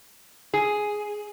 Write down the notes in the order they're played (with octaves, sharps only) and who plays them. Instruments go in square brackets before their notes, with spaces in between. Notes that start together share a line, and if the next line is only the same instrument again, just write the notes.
[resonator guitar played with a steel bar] G#4